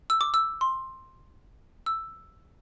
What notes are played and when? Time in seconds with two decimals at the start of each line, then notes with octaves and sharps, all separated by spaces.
0.10 E6
0.21 D6
0.34 E6
0.61 C6
1.86 E6